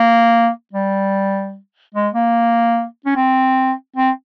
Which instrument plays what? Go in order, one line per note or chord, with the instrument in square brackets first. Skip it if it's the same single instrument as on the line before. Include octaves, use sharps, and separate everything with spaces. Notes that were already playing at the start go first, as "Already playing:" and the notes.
Already playing: [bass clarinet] A#3
G3
G#3
A#3
C#4
C4
C4